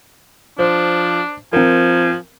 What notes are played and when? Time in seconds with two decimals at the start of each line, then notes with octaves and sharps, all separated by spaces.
0.59 F3 D4 C5
1.53 F3 C4 A#4 G#5